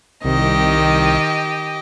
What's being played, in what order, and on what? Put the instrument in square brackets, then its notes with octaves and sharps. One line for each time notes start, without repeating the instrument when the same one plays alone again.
[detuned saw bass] C2 [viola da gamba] D#3 [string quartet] G4 D#5